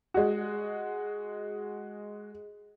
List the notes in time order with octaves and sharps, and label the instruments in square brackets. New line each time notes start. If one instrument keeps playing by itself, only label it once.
[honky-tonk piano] G#3 F#4